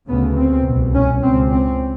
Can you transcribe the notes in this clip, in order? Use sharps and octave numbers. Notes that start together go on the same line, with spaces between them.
D2 C#3 B3
C4
C2 B2
C#4
C#2 B2 C4
C4